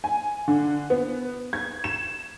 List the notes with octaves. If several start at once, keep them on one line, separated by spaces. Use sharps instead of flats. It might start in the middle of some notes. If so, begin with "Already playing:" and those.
G#5
D3
B3
G#6
E7